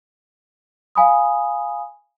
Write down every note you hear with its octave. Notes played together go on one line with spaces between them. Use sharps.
F5 G#5 B5 D#6